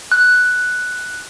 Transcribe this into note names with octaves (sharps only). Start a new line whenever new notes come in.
F#6